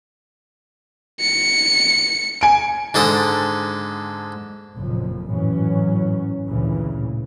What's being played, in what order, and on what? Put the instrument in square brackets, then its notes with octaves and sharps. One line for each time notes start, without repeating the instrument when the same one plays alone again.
[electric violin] C#7
[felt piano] G#5 D7
[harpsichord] G#2 D3 A4 D#6
[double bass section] F#1 F2 A#2 F3
G#1 F#2 A2 E3 F#3 C#4
A1 D2 G2 A#2 C#3 E3